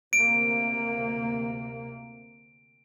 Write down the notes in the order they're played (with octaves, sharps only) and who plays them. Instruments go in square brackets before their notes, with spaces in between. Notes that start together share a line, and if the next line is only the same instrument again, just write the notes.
[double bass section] D2 C3 A#3 [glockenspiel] D7